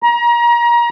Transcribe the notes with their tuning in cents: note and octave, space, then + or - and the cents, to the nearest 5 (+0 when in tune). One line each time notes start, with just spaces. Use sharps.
A#5 +30